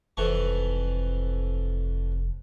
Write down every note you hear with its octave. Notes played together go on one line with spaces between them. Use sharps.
F1 F2 E3 C#6